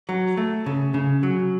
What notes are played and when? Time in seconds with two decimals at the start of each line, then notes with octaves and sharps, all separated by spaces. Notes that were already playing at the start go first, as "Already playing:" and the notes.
0.09 F#3
0.37 A3
0.66 C#3
0.94 C#3
1.23 F#3